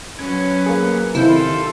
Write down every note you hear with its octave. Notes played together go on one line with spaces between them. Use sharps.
F#3 C#4 B4 G#6
A#3 G#4
C3 D#3 E4 F4 A4 G6